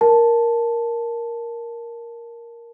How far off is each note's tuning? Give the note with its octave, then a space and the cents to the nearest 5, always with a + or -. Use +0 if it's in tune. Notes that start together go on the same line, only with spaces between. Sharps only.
A#4 +5 A5 +0